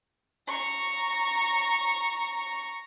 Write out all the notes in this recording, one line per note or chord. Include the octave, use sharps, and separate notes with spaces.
A#5 C#6